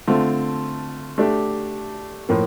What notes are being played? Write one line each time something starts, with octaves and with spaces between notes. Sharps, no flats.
D3 A3 C4 F4
A3 D4 G4
A2 F3 A#3